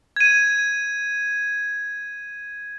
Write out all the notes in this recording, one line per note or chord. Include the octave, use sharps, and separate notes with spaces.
G#6 D#7